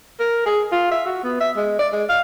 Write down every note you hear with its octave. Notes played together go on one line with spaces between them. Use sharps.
A#4
G#4
F4
E5
F#4
B3
E5
G#3
D5
G#3
F5